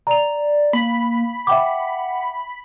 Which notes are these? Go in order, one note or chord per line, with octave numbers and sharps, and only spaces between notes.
D5 A#5 F7
A#3 B5
E5 F#5 G5 D6